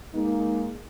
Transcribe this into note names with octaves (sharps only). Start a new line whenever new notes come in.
G#3 A#3 D#4